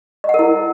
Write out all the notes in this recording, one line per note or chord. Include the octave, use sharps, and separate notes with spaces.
D#5
F#5
A#4
E4
A#4